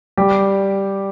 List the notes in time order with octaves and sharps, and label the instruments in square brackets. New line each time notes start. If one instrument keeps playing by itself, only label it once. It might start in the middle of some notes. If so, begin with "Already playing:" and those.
[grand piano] G3 G4